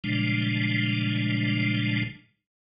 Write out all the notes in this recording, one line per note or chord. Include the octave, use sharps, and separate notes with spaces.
A#2 C#3 F3 G3 G#3 D4